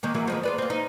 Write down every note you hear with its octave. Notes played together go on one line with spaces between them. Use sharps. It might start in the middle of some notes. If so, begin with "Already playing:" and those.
D#3 G#3 A#3
E3 F#3 A#3
F3 G#3 B3
F4 B4 D5
A#3 C4
D#4